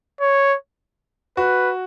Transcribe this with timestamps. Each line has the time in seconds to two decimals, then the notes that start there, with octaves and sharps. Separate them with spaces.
0.21 C#5
1.37 F#4 B4